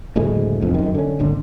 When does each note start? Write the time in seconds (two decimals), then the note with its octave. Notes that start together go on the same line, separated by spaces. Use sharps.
0.16 F#1 D2 A2 G#3
0.61 F1 B1 F2
0.74 F#2 D#3
0.95 D3 C#4
1.19 D#1 G#1 D3